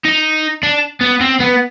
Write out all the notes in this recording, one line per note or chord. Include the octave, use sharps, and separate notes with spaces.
D#4
D4
B3
C4
B3